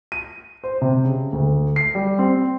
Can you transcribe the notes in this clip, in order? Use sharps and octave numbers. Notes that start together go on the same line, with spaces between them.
D#7
C5
C3
C#3
D2
C7
G3
C4